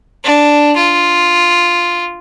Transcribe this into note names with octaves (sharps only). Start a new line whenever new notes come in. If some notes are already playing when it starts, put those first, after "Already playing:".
D4
F4